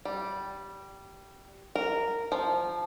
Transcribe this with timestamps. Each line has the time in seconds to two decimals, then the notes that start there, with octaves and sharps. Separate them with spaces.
0.05 G3
1.75 A#4
2.32 F3